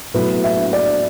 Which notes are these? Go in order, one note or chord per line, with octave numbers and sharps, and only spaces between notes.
A2 F#3 B3 B4
E5
D5